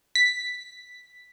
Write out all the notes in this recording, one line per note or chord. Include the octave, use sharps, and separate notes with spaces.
B6